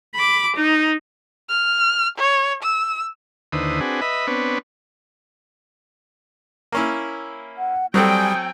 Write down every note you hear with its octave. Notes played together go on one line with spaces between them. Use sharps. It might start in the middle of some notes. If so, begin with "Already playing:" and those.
B5 D6
D#4
F6
C#5
E6
D#2 D3 E4 B4 C5 D#6
C4 D4 F#4 G#4 B4
B4 D#5 E5 B5
B3 C4 D4 B4 C#5
A#3 C#4 E4
F#5
F#3 G3 C4 A4 G5 G#5 D#6